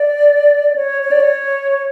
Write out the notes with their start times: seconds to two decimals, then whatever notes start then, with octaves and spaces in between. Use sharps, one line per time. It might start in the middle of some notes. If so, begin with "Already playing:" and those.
Already playing: D5
0.70 D5
0.76 C#5
1.02 C#5
1.11 D5
1.21 C#5